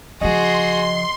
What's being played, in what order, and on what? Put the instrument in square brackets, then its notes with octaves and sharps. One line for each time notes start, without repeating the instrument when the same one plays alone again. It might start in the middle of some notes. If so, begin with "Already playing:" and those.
[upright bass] C#3 F3 [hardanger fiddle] F#4 G#4 [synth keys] D#5 [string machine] C6